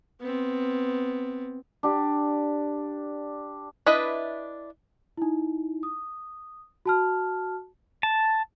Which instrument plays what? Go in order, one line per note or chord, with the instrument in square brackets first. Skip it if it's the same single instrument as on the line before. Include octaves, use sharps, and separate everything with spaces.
[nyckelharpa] B3 C4
[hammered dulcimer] D4 G4
[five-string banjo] D4 E4 B4 D#5 E5
[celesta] D#4 E4
D#6
F#4 A5 F6
[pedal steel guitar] A5